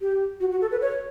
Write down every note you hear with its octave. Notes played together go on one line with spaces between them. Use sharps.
G4
F#4
F#4
A4
B4
C#5